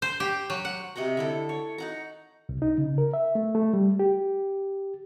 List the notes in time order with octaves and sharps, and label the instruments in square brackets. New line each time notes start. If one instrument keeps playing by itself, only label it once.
[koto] C5
G4
F#3
F#5
[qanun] C3 D#5 F#5 A#5
D3 E4 A4
C#5
D#4 F#5 A#5
[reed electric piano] C2
D#4
C#3
A#4
E5
A3
A3
G3
G4